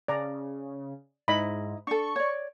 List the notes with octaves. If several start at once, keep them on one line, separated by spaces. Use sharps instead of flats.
C#3 D5 A#5
G#2 D#4 E4 D#5 B5
D4 A4 C#6
C#5 D5